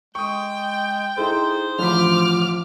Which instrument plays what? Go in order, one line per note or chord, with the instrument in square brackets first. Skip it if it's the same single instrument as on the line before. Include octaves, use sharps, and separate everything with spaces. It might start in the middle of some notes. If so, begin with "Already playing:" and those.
[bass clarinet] G#3 [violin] G5 [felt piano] C#6 D#6
[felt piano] D#4 E4 A4 [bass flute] G#4 [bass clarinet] C5
[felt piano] A1 D2 B5 [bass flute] F3 [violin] D6 F6